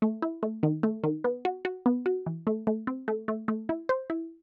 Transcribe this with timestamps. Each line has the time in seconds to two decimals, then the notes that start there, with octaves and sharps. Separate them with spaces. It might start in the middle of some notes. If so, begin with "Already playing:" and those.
0.02 A3
0.22 E4
0.43 A3
0.63 D#3
0.83 A3
1.04 D#3
1.24 B3
1.45 F#4
1.65 F#4
1.86 B3
2.06 F#4
2.26 E3
2.47 A3
2.67 A3
2.87 C4
3.08 A3
3.28 A3
3.48 A3
3.69 E4
3.89 C5
4.10 E4